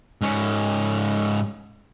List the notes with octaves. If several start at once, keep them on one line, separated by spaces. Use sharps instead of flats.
G#2 C#4